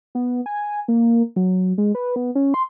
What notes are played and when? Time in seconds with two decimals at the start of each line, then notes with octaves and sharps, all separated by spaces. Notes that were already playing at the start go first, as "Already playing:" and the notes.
0.15 B3
0.46 G#5
0.88 A#3
1.36 F#3
1.78 G#3
1.95 B4
2.16 B3
2.35 C#4
2.54 C6